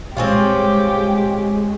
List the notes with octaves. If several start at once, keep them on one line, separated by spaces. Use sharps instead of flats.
A#2 G3 G#3 C4 C#4 F4 G4